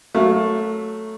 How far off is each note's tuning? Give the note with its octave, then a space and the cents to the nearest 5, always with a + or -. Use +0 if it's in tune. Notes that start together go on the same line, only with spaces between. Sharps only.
F#3 +5 A3 +0 F5 +25